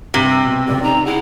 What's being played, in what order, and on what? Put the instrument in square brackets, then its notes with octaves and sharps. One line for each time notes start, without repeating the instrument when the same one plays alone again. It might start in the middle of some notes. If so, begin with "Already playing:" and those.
[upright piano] G2 [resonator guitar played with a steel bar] C3
[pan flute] E6
[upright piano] B2
[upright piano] F1 C#2 [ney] D5
[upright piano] C#3 [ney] D#4 [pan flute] A#5
[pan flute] E4 [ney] G#4 [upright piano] F#5